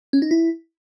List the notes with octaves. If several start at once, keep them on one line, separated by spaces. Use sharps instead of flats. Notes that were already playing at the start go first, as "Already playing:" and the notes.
C#4
D#4
E4